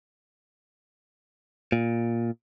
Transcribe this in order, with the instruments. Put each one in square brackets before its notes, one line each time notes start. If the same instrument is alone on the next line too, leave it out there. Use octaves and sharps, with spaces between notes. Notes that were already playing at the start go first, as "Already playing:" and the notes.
[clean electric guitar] A#2